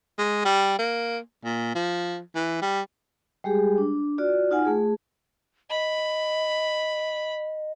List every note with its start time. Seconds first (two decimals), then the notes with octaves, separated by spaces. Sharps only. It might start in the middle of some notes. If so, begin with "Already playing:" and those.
0.18 G#3
0.45 G3
0.79 A#3
1.44 A#2
1.75 F3
2.35 E3
2.62 G3
3.44 G3 G#3 G4 G#4
3.78 D4
4.18 F4 F#4 D5
4.51 D#4 F4 F#5 G#5
4.65 A3 G#4
5.70 D#5 B5